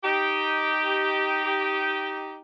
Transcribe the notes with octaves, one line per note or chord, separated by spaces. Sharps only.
D#4 G4